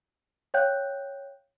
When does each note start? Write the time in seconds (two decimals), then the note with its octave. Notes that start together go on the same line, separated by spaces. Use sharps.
0.54 C#5 F5 G5 F#6 G6